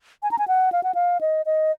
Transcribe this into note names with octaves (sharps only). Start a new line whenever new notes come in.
G#5
A#5
G#5
F#5
F5
F#5
F5
D#5
D#5